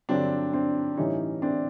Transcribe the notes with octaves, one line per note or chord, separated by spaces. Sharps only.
G2 D3 F#3 C4 D4
C4 D4
A2 E3 G3 C#4 D#4
C4 D4